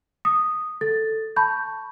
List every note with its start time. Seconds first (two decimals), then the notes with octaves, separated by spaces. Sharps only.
0.25 D#6
0.81 A4 A6
1.36 A5 B5 C#6 G6